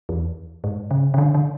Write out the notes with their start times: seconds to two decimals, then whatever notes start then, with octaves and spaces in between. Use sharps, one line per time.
0.09 E2
0.64 G#2
0.91 C#3
1.14 C#3
1.18 D3
1.35 D3